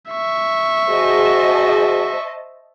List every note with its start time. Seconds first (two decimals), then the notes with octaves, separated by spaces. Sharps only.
0.11 E5 C#6
0.89 F#4 G#4 C5 D#5 A5